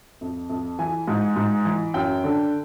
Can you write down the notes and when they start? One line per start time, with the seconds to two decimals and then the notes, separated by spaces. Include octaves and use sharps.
0.21 F2
0.49 F2
0.79 E3 G#5
1.08 G#2
1.36 G#2
1.65 E3
1.94 F#2 G5
2.24 D3